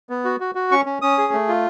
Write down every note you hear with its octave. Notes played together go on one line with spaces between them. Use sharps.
B3
F#4
F#4
F#4
C#4 C#6
C#4
C#4 D#6
G#4
A3
F4